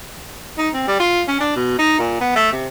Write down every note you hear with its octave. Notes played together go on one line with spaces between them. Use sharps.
D#4
C4
G3
F4
C#4
D4
B2
D#4
A#2
B3
A3
C3